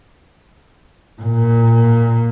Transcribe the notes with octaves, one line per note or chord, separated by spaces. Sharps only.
A#2